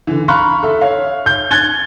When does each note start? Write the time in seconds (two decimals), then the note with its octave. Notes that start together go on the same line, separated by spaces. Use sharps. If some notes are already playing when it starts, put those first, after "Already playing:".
0.07 D3 E3
0.28 F5 A#5 B5 C#6 F6 F#6
0.63 A4 E5
0.81 C#5 F5
1.26 G6
1.51 F#6 G#6 A6 G7